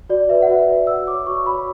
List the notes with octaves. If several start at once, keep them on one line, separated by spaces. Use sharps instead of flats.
F#4 D5
B4 D5 E5
F#5
F#4 E5
B4 D5
F#4 E6
C#5 D6
F#4 C#6
C#5 B5